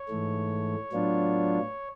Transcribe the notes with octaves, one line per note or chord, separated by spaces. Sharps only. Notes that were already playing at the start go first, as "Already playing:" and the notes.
Already playing: C#5
G#2 E3 A3
A2 F#3 B3 D4 F4